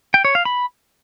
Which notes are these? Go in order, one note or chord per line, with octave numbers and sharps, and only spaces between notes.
G5
C#5
F5
B5